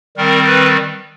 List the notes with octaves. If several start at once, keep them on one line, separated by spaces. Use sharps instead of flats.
D#3 G3 C4 A#4
B4